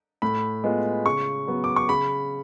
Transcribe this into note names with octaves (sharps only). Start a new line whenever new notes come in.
A2 B5
G#3 B3 F4
C#3 C#6
F#3 B3
D6
C#6
C#3 B5